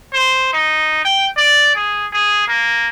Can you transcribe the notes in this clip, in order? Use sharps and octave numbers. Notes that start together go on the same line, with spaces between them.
C5
D#4
G5
D5
G#4
G#4
A#3